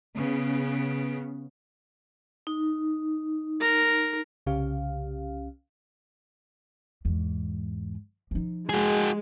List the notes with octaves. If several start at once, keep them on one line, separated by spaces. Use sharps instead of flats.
C#3 B3
D#4
A#4
C2 C#3 C#4 G4 F5
E2 G#2
F3 D#4
G#3 F#4 G#4